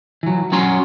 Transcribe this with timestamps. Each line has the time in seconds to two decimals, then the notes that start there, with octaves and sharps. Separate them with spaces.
0.23 E3 F#3
0.52 F#3 C#4 F#4 C#5 A#5 C6